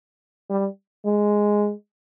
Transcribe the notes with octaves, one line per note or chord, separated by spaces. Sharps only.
G3
G#3